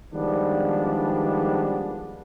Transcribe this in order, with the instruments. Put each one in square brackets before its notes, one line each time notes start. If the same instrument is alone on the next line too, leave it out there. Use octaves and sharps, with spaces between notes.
[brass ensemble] D#3 F3 G3 G#3 B3 D4